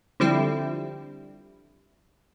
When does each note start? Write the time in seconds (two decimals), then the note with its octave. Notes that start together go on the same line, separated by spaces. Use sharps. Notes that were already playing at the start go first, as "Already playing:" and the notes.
0.20 D3 F3 G3 C4 E4